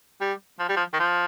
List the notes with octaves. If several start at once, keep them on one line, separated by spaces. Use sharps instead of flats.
G3
F3
G3
F3
D#3
F3